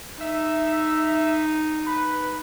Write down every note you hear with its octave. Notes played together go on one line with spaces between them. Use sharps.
D#4 E5
B4